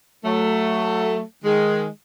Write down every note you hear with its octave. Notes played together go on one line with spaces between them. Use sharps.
F#3 A3
D#3 G#3